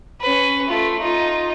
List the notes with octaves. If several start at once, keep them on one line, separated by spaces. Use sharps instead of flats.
C#4 B4
A3 F4
D#4 F4